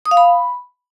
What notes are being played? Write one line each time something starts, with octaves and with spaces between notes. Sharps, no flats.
D#6
F5
B5